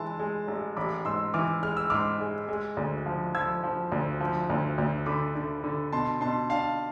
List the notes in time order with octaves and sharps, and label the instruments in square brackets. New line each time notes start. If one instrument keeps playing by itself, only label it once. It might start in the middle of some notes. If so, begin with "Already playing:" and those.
Already playing: [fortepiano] E3 G#3 [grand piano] A5 C6
[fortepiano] G#3
A1
[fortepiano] A1 [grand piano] B5 D6
[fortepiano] G#2 [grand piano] C6 E6
[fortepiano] E3 [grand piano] D6 F6
[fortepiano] G#3 [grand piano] F6
[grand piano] E6
[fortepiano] G#2 [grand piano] D6 F6
[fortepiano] G#3
G#3
D2
F3
[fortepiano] F3 [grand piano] E6 G#6
[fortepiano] F3
D2
F3
D2
D2
[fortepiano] D3 [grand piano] B5 D6
[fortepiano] D3
D3
[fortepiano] B2 [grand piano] A5 C6
[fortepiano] B2 [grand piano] A5 C6
[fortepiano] D4 [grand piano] F5 A5